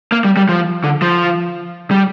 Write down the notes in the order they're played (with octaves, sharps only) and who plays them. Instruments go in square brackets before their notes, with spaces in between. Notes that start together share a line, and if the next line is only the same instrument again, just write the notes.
[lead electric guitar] A#3
G3
G3
F3
D3
F3
G3